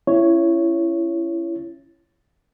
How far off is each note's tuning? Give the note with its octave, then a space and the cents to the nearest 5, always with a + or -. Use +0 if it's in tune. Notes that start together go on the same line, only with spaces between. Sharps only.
C#4 +0 E4 +30 C#5 +0